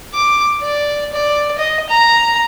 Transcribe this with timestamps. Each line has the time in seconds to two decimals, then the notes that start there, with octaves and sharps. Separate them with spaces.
0.14 D6
0.62 D5
1.13 D5
1.58 D#5
1.89 A#5